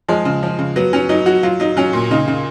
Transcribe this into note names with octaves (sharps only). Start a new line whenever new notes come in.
F3 G#3
C#3
F3
C#3
F#3 B3
F#3 C#4
F#3 D#4
F#3 F#4
F#3 F4
F#3 D#4
F#3 C#4
A#2
C#3 D#4
C#3